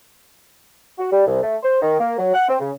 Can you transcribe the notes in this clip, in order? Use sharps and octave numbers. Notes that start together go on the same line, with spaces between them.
F#4
G3
C2
A3
C5
D#3
A#3
F#3
F#5
C4
C#3